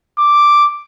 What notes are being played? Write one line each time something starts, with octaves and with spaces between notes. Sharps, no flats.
D6